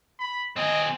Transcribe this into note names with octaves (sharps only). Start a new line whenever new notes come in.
B5
C4 G#4 D#5